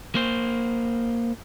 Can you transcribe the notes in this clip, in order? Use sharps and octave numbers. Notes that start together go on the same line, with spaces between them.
A#3 C5